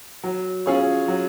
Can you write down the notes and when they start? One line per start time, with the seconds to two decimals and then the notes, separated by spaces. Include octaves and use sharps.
0.24 F#3
0.66 C#4 F4 G#4 C#5
1.08 F#3